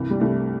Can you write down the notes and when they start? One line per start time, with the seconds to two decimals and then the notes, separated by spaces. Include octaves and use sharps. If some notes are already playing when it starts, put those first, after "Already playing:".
Already playing: C2 G2 E3
0.10 G3
0.20 C2 A3